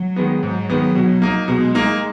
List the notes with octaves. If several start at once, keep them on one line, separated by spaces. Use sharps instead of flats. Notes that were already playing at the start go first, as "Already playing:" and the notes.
Already playing: F#3
D#3 G#3 B3
G#2 F#3
D#3 G#3 B3
B2
A#3 D#4
B2 G#3
A#3 D#4